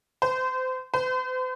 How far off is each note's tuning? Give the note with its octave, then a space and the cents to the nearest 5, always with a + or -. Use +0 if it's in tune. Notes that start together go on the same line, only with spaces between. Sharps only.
C5 -30
C5 -45